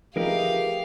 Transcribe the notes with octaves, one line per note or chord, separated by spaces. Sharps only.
F3 A3 D#4 G4 G#4 A#4 B4 F5